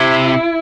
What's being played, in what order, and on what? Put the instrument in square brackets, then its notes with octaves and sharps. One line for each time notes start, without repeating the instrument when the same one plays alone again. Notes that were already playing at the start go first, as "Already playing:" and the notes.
Already playing: [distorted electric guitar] C3 [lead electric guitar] E4